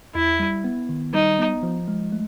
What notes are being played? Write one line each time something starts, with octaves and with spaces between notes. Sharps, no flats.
E2 E4
G3
B3
D#3
G3 D#4
B3
F3
G#3
A3